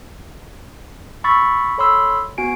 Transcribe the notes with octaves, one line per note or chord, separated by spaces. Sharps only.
B5 C#6 E6 A6 B6
A4 C#5 B5 C6 E6
B3 F#4 G#5 D7